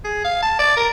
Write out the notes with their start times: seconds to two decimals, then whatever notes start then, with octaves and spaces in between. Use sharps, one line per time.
0.04 G#4
0.24 F5
0.43 A5
0.59 D5
0.77 A#4